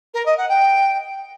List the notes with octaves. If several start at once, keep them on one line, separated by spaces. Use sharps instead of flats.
A#4
D#5
F#5
G5